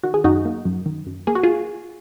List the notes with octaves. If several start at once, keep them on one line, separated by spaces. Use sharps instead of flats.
D#3 F#4
G#4
F#2 D#4 F#4
A#3
F#2
D#3
F#2
A#3 G#4
F#4
F4 G#4